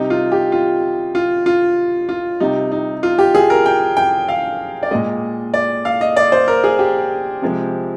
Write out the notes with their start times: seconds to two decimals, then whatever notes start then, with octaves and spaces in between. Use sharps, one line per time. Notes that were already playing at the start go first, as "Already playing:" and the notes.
Already playing: C3 G3 D#4
0.10 F4
0.32 G4
0.52 F4
1.15 F4
1.46 F4
2.09 F4
2.40 C3 G3 D#4
2.72 D#4
3.03 F4
3.19 G4
3.35 G#4
3.50 A#4
3.66 G5
3.97 G5
4.28 F5
4.83 D5
4.91 A#2 G#3 D#5
5.54 D5
5.85 F5
6.01 D#5
6.16 D5
6.32 C5
6.48 A#4
6.64 G#4
6.79 G4
7.42 C3 F3 G#3